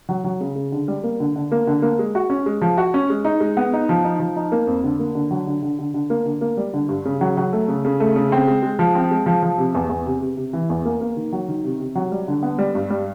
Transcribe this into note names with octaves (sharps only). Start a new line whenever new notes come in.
F#3
F#3
C#3
C#3
D3
G3
A#3
D3
D3
A#3
D3
A#3
G#3
F#4
C#4
G#3
F3
F#4
C#4
G#3
D#4
G#3
B3
D#4
F3
D#4
F3
D#4
A#3
F2
D3
A#3
D3
F#3
D3
D3
D3
D3
A#3
D3
A#3
G3
D3
G2
C#3
F#3
F#3
A3
C#3
C#3
A3
C#3
C4
G#3
G#3
F3
C4
G#3
F3
F3
C3
E2
E2
C3
C3
C3
E3
E2
A#3
A#3
D#3
F#3
D#3
C3
C3
F#3
G3
D3
B3
G3
G2
G3